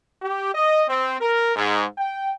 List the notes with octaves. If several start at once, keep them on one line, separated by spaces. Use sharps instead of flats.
G4
D#5
C4
A#4
G#2
G5